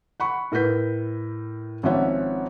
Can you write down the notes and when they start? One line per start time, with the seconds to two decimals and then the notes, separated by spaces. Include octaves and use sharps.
0.20 F#5 B5 C#6
0.52 A2 A#4 B4 G6 B6
1.83 G#1 F3 C#4 E5 F#5